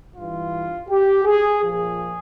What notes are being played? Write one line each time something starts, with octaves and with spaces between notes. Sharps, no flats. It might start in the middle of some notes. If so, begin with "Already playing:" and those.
G2 E3 F4
G4
G#4
A#2 F3 G#4